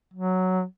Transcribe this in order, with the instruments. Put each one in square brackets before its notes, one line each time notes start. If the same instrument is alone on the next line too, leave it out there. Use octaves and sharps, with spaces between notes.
[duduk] F#3